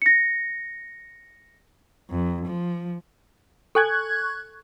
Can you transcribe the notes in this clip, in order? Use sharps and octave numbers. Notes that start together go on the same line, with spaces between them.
A#6 C#7
F2
F3
A4 G#5 A5 C#6 F#6 G#6